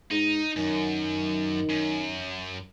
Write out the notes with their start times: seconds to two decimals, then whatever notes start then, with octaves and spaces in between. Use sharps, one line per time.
0.11 G#2 D#4
0.56 F#2 D#3
1.69 F#2